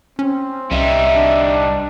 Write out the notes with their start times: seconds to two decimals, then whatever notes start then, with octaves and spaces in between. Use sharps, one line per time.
0.19 C4 C#4
0.71 C2 G3 D#4 E5
1.15 D4